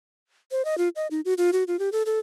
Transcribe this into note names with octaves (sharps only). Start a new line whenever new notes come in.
C5
D#5
F4
D#5
D#4
F#4
F4
F#4
F4
G4
A4
A4